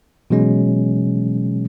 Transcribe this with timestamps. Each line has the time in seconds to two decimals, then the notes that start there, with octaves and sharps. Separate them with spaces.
0.30 B2 E3 F#3 G#3 C#4